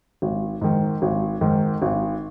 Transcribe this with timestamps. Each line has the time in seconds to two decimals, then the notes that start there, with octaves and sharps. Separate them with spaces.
0.22 G#1
0.61 G#2 D#3
1.02 G#1
1.41 G#2 D#3
1.82 G#1